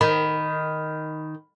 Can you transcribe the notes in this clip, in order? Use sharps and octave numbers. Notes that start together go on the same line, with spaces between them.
D#3 B5